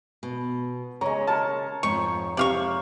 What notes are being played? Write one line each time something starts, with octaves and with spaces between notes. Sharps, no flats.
B2
C#3 G#3 C#5 A#5
A#4 A5
F2 G#2 C#6
C3 C5 D5 F5 C#6